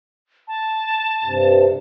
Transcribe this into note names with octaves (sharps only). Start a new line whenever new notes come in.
A5
G2 C3